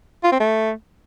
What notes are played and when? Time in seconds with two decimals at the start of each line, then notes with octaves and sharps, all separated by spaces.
0.24 F4
0.32 C4
0.40 A3